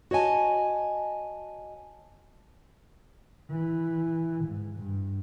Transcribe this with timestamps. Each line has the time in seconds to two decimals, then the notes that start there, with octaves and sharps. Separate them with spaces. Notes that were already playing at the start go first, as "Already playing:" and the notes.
0.11 F#4 C#5 D#5 G#5 A5
3.50 E3
4.44 G#2
4.75 G2